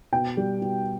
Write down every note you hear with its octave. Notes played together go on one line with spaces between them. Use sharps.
B2 G5
G3
B2